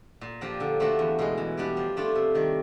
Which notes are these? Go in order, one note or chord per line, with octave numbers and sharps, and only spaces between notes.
A#2
F3 A#3 D4 G4
D3
F3 A3 D4 F#4
E2
B2 G#3
E3
G3 B3 D4 G4
F3
A3 D4 F4
C3
D#3 G3